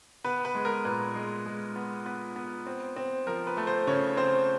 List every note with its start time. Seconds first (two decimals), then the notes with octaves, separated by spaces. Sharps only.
0.24 B3 B4
0.45 B4
0.55 G#3
0.65 A#4
0.85 A#2 B4
1.15 G#3
1.46 G#3
1.76 B3
2.06 B3 B4
2.36 B3
2.67 C4
2.96 C4
3.27 F3 A#4
3.47 B4
3.57 A3
3.67 C5
3.87 C#3 C#5
4.17 C4 C5